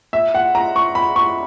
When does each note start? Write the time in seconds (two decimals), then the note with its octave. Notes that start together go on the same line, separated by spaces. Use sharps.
0.13 E5
0.35 F#5
0.55 A#5
0.76 C#6
0.95 B5
1.16 C#6